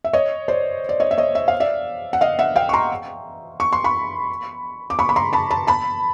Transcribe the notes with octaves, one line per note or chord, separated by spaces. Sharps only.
E5
C#5 D#5
C5 D5
D5
C#5 D#5
E5
C#5 D#5
E5
F5
D5 E5
F#5
D#5 F5
E5 F#5
F5 G5
C#6
A#5 C6
C#6
C6
B5 C#6
D6
B5 C#6
B5
A#5 C6
A5 B5
A5 B5
A5 B5